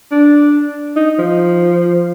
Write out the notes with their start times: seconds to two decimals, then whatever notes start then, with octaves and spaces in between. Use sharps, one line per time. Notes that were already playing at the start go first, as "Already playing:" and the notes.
0.12 D4
0.96 D#4
1.19 F3